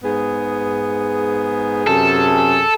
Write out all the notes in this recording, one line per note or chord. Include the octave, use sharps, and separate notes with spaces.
G#2 B3 G#4
F#2 C3 G#4 A4